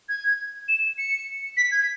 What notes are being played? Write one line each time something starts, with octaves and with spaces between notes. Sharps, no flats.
G#6
E7
C#7
B6
G#6